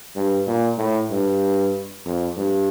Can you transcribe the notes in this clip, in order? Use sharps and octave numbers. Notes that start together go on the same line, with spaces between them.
G2
A#2
A2
G2
F2
G2